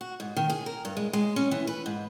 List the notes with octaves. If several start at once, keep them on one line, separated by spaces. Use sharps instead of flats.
F#4
G#2
D#3
G#4
A#4
G2
G#3
G#3
C#4
E3
B4
G#2